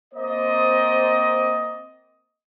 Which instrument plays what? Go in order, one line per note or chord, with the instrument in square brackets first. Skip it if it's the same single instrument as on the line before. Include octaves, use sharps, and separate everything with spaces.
[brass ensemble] A#3 C4 C5 D5 D#5